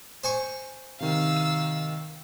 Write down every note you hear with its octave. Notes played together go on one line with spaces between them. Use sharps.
C5 G#5 C#6
C3 D#3 F5 E6